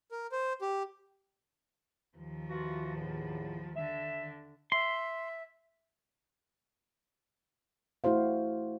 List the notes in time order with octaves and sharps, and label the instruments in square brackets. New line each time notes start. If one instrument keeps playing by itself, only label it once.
[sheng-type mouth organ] A#4
C5
G4
[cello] D#2 F3
[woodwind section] E3 F4 F#4
E2 A2
[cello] D3 [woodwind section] E5
[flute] E5 [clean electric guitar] C6
[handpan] A3 E4 F#4 C5 F5